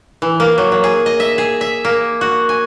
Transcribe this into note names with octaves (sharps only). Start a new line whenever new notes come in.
E3
A#3
F#3
F#3
G#4
D#5
E5
G#4
E5
A#3
F#4
G#5